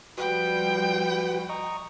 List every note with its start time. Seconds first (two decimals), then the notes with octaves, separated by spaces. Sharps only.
0.18 F3 G3 F#4 B4 G5
1.49 D#5 A#5 C#6